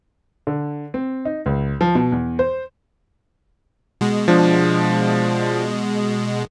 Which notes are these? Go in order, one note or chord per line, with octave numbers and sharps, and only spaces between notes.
D3
C4
D#4
C#2
F3
B2
E2
C5
B2 G#3
F3 D4